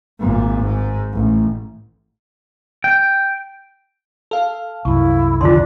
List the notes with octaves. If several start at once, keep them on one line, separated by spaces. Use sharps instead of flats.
G#1 A#2
G#2
A1
G5
A4 F5
C2 F#2 E4 C#6
F2 D3 D#3 D4 F4 C6